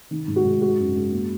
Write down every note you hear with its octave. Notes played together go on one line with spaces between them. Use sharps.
D#3
G#2
F#4
G#2
G#3 F#4
F#2
G#3
A#3